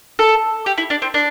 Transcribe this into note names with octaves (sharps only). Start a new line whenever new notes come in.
A4
G4
E4
D4
C4
D4